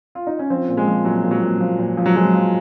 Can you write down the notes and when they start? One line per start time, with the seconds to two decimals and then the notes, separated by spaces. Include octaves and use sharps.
0.15 F4
0.27 D#4
0.39 C#4
0.50 F3 C4
0.68 A#2
0.77 G#3
0.87 F3
1.05 A#2 F#3
1.23 A#2
1.31 F#3
1.42 A#2
1.61 F3
1.78 A#2
1.97 F3
2.06 F#3
2.15 F3 G#3
2.34 F3